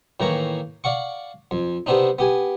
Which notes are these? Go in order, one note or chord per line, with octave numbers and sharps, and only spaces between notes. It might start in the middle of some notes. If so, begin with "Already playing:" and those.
A2 D#3 E3 A#3 A#5 C#6
D5 F5 F#5 C#6
F2
C3 B3 C4 D4 D#4
B3 G4 G#5